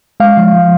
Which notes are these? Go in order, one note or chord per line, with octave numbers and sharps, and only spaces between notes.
G#3 F5
F3
F3